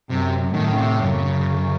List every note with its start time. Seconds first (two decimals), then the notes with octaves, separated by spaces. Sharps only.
0.10 F#2 C3
0.54 A2 D#3
0.72 C#3
0.77 C3
0.99 F#2 C#3